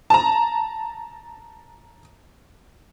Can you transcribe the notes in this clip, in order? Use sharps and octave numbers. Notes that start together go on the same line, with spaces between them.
A5 A#5